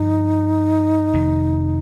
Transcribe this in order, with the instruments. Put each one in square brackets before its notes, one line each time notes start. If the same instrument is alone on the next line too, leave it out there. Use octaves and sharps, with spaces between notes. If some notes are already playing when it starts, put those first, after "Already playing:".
Already playing: [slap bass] G2 D3 F3 [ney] D#4
[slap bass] F1 F2 D#3